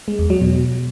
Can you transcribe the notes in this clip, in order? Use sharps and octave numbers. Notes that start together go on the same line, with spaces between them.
G#3
E2
F#3
B2